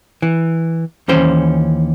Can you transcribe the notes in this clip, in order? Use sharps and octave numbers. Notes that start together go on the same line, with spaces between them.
E3
D#2 E3 C#4 C5